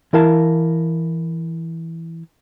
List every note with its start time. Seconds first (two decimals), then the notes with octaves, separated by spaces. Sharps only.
0.13 E3 E4 A#4 F5 A5